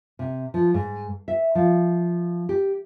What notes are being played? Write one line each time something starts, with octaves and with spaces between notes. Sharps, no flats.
C3
F3
G#2
E5
F3
G4